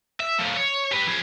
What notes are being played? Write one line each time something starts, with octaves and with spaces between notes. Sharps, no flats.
E5
A2 F3
C#5
G4 B4
F3 G#4